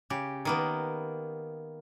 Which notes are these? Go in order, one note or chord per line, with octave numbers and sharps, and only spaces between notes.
C#3 G4
D#3 A#3 B3